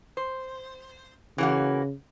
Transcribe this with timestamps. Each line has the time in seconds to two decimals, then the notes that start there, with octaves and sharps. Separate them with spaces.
0.17 C5
1.38 C#3 E3 A#3 F#4